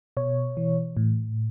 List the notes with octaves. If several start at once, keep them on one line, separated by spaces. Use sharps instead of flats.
B2 C#5
E3
A2